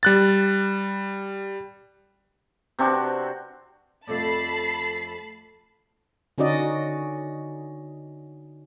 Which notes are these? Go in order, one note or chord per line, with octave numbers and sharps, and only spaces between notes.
G3 F#6 A6
C3 C4 D4 F#4
F2 A3 D5 A5 B5 C7
D3 C#4 D#4 F#4 D5 D#5